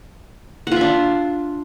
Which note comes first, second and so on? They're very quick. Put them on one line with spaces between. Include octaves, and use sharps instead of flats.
F#5 F4 E5 D4